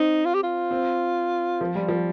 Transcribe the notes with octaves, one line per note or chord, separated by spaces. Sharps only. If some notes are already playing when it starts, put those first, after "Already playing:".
Already playing: C4 D#4
F4
G4
F4
C4
F3
G3
F3